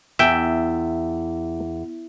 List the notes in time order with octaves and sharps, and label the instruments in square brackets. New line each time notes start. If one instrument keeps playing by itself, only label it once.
[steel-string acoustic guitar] E2 [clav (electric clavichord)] E5 G5